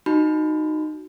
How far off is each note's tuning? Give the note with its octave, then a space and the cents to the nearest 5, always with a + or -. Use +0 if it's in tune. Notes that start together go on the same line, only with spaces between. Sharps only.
D#4 -15 F#4 +0 B5 +0